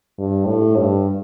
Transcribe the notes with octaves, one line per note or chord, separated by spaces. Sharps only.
G2
A2
G2